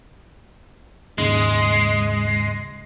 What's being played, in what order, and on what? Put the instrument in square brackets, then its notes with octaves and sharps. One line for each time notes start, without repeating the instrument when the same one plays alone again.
[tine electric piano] D#2 G#2 C#3 [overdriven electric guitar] G#3